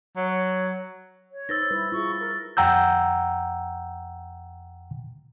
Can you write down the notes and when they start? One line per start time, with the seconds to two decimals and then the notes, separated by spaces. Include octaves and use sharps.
0.16 F#3
1.32 C#5
1.49 D#4 B4 C5 E6 A6 A#6
1.71 G3 E4 B4
1.92 E4 F4 G#4 C#6
2.20 A#4
2.57 F2 F#5 G5 A#5 E6 G6